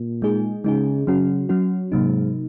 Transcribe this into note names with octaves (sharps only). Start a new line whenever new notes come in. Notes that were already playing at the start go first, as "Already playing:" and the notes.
Already playing: A#2
G#3 D#4 G#4
C#3 G#3 D#4 G#4
C#3 F#3 C#4 F#4
F#3 C#4 F#4
G#2 C3 F#3 A#3 D#4